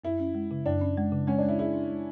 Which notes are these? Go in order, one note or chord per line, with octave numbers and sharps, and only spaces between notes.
F#2 E4
C#4
G#3
C#3
F#2 D4
C#4
G#3
C#3
G#3 C#4
G#3 D4
E4
E4 G#4
D4
G#3